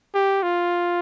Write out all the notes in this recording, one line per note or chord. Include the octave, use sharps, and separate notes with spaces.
G4
F4